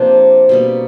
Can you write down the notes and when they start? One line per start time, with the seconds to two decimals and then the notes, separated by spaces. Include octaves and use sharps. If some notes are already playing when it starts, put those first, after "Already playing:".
Already playing: C3 F3 A#3 C4 D4
0.49 B2 G3 A#3